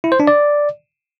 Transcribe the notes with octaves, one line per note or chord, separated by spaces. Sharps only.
E4
C5
D4
D5